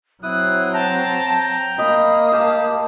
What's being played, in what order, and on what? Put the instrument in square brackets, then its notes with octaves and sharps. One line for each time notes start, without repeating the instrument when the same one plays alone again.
[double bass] F#3 C4 [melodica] E4 D#6 [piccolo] F#6
[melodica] G5 A#5 [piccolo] A5
[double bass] A#3 [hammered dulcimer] D#5 B5 [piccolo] D#6
[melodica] G4 [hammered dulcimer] A5